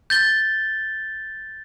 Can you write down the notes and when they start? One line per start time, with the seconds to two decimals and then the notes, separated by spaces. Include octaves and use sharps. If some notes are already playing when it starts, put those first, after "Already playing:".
0.10 G6 A6 G7